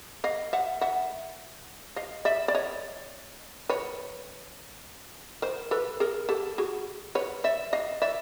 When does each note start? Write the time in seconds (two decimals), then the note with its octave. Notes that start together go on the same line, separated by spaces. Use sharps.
0.24 D#5 F5
0.53 E5 F#5
0.81 E5 F#5
1.96 D#5 F5
2.25 D5 E5
2.48 D5
2.55 C#5 D#5
3.69 B4 C#5
5.42 A#4 C5
5.71 A4 B4
6.00 G#4 A#4
6.29 G4 A4
6.58 F#4 G#4
7.15 B4 C#5
7.44 D5 E5
7.73 D#5 F5
8.02 D5 E5